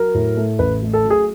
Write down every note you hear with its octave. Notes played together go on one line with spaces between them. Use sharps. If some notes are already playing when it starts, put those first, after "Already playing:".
Already playing: F#3 A#4
A2
A3
A1 B4
A3
A4
F#3
G#4